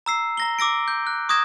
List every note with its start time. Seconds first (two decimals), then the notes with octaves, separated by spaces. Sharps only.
0.06 A#5 E6 C7
0.37 A#5 A#6 G7
0.59 D6 E6 A#6 D7
0.88 G6
1.07 F#6
1.29 C#6 D#6 F#6 G#6 A#6 E7